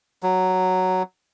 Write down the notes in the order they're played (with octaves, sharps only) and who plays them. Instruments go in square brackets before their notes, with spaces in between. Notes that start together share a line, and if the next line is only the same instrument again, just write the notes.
[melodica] F#3